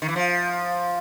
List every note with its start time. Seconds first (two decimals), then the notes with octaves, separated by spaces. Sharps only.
0.02 D#3
0.09 E3
0.16 F3